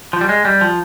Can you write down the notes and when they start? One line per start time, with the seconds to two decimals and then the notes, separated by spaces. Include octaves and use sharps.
0.13 F3
0.21 G3
0.29 G#3
0.45 G3
0.61 F3